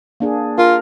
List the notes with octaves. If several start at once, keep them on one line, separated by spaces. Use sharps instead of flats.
A#3 D4 G#4
F4 A#4